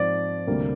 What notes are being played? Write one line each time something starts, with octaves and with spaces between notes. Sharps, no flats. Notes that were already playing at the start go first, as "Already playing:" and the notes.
Already playing: G#2 F3 C4 F4 D5
D2 C3 G3 A#3